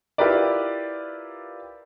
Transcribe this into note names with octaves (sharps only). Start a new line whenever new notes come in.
E4 F4 G4 A#4 B4 D5